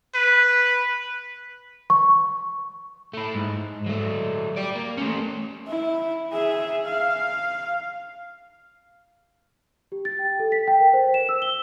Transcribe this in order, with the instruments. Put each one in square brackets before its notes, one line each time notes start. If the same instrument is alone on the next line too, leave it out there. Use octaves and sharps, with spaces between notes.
[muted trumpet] B4
[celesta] C#6
[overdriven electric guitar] A3 E4
G#2
F#3 A3
G4 D5
A#3
A3 C#4
[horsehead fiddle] E4
G#4 E5
F5
[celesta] G4
A6
G5
A4
B6
G5
A#4
C5
E7
E6
G7